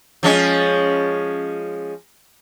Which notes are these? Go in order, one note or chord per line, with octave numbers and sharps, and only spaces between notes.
F3 G#3 C#4